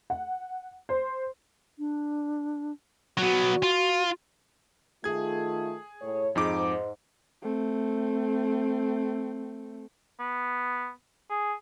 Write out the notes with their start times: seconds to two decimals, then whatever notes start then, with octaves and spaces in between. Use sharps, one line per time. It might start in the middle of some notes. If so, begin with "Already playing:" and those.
0.10 F#5
0.89 C5
1.79 D4
3.18 F#3 B3 F#4
3.63 F4
5.04 D#3 A3 F4 G#4 G#6
6.02 A2 C#5
6.36 F2 G#2 D#4 D6
7.42 A3 C4
10.20 B3
11.30 G#4